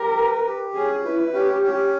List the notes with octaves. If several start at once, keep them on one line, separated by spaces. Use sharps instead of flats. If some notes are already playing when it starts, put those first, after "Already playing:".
Already playing: G4 A#4
B4
G4
C#4 G#4
E4 B4
C#4 G4
C#4